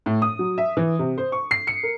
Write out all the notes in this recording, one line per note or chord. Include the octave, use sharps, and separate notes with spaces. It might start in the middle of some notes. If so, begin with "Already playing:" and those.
A2
D#6
F#3
E5
E3
C3
C5
C#6
C7
C#7
A#4